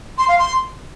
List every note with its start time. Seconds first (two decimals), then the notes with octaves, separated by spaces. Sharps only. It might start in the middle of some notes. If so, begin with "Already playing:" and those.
0.18 C6
0.28 F5
0.38 C6